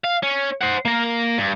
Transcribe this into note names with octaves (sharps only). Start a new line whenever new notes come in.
F5
C#4
C5 F#5
A#3 A#4
G2